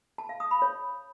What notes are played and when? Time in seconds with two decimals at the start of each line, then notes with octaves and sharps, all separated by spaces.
0.18 A5
0.29 F5
0.40 D#6
0.51 B5
0.62 C#5